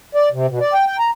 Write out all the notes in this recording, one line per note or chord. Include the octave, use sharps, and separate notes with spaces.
D5
C3
B2
D5
G5
G5
A#5